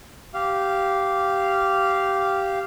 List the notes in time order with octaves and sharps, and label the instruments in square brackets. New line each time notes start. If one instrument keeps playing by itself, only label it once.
[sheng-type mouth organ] G4 F5